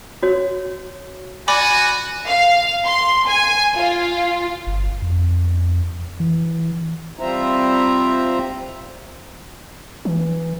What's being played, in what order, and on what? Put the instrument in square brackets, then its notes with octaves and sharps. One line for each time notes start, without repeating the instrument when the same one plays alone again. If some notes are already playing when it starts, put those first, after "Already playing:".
[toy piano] F#4 C#5
[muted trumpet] F#4 [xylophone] D5 B5 D6 [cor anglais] G#5
[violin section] F5
C6
G#5
F4
[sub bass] G1
F2
E3
[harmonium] G3 C4 F4 C5 E5 A#5
[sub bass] E3